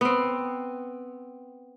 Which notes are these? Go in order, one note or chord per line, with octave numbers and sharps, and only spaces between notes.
B3 C4